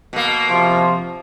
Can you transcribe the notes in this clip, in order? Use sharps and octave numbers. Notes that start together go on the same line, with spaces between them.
B2 A#3
C3 F3